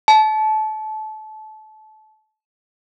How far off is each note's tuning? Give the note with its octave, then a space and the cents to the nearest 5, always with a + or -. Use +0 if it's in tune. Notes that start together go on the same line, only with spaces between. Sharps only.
A5 -25